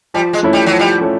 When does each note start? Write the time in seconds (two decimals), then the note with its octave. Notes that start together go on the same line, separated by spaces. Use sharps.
0.14 F3 G3
0.33 G#3
0.43 A3 C#4 E4
0.53 G3
0.66 F#3
0.73 F3
0.79 G3
1.01 A3 C#4